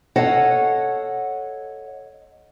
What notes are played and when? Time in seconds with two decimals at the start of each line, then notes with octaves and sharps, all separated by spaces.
0.16 A4 C#5 D#5 F5 F#5